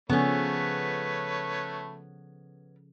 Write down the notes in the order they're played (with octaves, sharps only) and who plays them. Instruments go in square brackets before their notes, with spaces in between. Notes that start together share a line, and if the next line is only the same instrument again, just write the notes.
[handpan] C#3 F3 A4 [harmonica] A3 B4 C#5 [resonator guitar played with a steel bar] B3 C#4